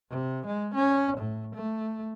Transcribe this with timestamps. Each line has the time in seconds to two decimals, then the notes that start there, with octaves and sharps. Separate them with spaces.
0.10 C3
0.46 G#3
0.75 C#4
1.17 A2
1.55 A3